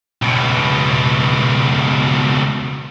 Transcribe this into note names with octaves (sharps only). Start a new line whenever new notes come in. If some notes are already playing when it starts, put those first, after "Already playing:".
C#2 B2